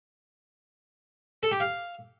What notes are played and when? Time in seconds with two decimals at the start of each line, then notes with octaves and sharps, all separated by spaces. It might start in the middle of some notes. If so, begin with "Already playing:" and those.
1.43 A4
1.52 G4
1.60 F5